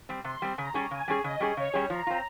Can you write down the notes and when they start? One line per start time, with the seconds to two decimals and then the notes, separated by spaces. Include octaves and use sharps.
0.09 G3 C4
0.24 C3 C6
0.42 G3 C4
0.58 C#3 A#5
0.74 G3 C#4 G#4
0.91 C#3 G#5
1.08 G3 C#4 G#4
1.24 C#3 D#5
1.40 G3 C#4 G#4
1.57 C#3 C#5
1.74 G3 C#4 G#4
1.90 F3 A#5
2.07 C4 F4